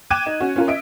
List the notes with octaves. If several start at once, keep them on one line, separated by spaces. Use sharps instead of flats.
G5 D6 F#6 G#6 D#7 E7
D#4
C#4 F#4
C#4 F4 A#4
D#5 E5 D7